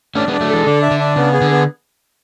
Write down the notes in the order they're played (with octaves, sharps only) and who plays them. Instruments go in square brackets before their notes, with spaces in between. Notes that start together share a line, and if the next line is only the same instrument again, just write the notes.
[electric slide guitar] A3 C#4 [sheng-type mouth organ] D4
[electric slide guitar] G#3 B3 [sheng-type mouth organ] D4
[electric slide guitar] F#3 A3
[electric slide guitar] E3 G#3 [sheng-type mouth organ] A4
[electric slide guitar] D3 [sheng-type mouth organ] D4
[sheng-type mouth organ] E5
[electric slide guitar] D3
[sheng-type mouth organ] D4
[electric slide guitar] C#3 [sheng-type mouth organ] B3
[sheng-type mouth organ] G#4
[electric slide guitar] D3
[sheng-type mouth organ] B3